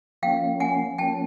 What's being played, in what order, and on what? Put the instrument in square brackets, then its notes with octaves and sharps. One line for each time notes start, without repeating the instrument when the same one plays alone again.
[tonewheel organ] F3 A#3 C#4 [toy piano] F5 G5
[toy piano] F#5 G#5
[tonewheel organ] F3 A#3 C#4 [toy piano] G5 A5